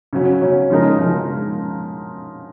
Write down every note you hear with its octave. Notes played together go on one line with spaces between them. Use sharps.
C#3 F#3 C#4
C#3 F#3 C#4
C#3 F3 G#3 D#4 A#4
C#3 F3 G#3 D#4 A#4